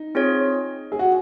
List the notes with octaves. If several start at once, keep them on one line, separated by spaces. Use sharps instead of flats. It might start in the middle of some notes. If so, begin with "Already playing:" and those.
Already playing: D#4
C4 F4 G#4 C#5
G#4
F#4